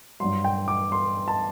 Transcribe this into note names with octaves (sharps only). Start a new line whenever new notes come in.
G2 F#3 C6
G5
D6
C6
A5